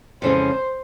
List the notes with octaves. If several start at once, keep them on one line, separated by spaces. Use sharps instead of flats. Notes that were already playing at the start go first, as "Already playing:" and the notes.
F2 C#3 E3 G#3 C#4 C5